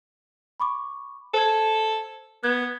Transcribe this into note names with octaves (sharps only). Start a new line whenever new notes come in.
B5 C#6 D6
A4 C5 G#6
B3 F#6 G#6